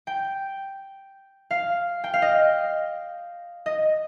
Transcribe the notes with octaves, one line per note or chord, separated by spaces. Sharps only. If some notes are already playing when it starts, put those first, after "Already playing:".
G5
F5
G5
F5
D#5
D#5